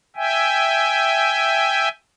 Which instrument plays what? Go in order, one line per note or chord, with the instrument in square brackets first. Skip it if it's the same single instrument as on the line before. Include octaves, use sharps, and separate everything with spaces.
[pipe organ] E5 G5 G#5